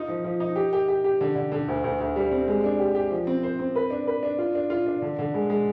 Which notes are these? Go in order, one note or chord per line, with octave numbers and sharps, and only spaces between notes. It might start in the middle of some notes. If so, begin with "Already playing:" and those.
Already playing: D#4 F4
F3
F3
D#4
G4
G4
G4
G4
D3
D3
D3
D2
D2
D2
G3
C4
G#3
D4
G4
G4
F3
C4
C5
C4
B4
D4
B4
D4
F4
D4
F4
D4
D3
D3
G#3
G#3